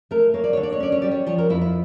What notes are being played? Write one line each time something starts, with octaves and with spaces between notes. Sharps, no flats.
A3 A#4
A#3 C#5
D5
D3 C#5
D5
C#5
C#4 D5
C#5
G3 D5
C#5
F3 C#5
A#4
F2 E4
E4